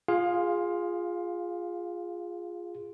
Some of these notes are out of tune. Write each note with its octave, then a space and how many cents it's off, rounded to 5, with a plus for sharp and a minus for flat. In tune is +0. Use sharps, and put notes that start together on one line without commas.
F4 +0 G#4 -10 F5 +20